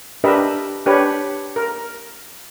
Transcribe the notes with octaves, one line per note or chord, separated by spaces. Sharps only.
D4 G4 A#4 B4 D#5 E5
D4 G4 B4 C#5
A#4